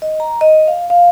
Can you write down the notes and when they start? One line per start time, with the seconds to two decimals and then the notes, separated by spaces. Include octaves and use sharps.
0.02 D#5
0.20 A#5
0.41 D#5
0.67 F5
0.90 F5